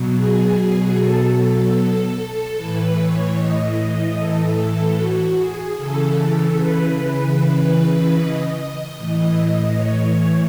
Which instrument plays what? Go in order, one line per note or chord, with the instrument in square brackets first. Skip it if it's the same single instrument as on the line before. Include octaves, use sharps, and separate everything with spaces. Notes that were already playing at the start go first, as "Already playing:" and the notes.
Already playing: [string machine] B2 F#3
G#4
A4
A2 E3 B4
C#5
D#5
A4
F#4
G#4
C#3 E3 A4
B4
D#5
A2 E3 D#5
C#5